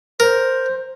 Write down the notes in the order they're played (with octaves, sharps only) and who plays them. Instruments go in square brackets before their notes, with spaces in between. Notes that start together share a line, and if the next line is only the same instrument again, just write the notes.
[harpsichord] A#4 [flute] C5